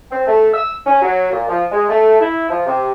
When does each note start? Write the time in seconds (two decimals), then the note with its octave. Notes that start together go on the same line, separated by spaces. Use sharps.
0.11 C4
0.26 A3
0.54 E6
0.87 C#4
1.02 F#3
1.31 A#2
1.49 F3
1.71 G#3
1.89 A3
2.20 E4
2.49 F3
2.66 C3